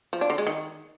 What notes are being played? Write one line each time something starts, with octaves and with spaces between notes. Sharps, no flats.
F3
D4
D3
G#3
D#3